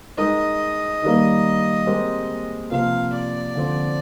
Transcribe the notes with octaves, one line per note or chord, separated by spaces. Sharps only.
G#3 D#4 A#4 D#5
D#3 G3 A#3
G#3 C4 G4 A#4
C3 F3 A#3 F4 F5
D5
D3 F3 C4